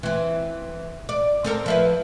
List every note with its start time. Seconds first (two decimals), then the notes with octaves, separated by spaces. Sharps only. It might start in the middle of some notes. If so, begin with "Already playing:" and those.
0.03 E3 C4
1.09 D5
1.44 C4 A4 A#4
1.66 F3 E4 B4